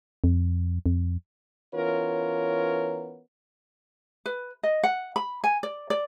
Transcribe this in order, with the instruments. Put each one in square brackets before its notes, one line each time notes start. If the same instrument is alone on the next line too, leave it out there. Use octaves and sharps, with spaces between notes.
[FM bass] F2
F2
[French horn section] E3 B3 C#4 F4 A#4 C#5
[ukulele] B4
D#5
F#5
B5
G#5
D5
D5